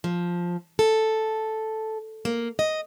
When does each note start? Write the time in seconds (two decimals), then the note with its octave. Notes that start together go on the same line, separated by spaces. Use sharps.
0.04 F3
0.79 A4
2.25 A#3
2.59 D#5